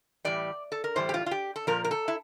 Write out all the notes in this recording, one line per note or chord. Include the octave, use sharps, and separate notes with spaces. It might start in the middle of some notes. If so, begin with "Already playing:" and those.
A2 E3 G3 D5
A4
A#4
A2 E3 G3 C5
G4
F4
F4
G4
A4
A#2 F3 A#4
A#4
A4
E4